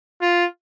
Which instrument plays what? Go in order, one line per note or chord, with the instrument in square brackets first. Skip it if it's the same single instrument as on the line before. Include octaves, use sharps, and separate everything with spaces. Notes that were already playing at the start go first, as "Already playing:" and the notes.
[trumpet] F4